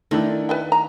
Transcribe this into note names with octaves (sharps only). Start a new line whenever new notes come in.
D#3 A3 D4 E4
B4 E5 G5
A#5